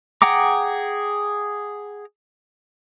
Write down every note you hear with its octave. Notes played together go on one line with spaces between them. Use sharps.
G#4 F#5 G5 A#5 D6